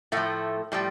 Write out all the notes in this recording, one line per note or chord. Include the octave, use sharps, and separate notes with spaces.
A2 F3 A3
A2 F3 G3